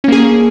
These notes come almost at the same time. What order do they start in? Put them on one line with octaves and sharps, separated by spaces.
C#4 A#3 G#4